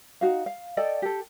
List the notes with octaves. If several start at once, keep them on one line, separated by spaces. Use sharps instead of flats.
D#4 F#4 F5
F5
A4 D5 D#5 G5
G4 A4